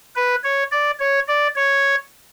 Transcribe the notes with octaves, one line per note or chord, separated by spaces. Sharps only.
B4
C#5
D5
C#5
D5
C#5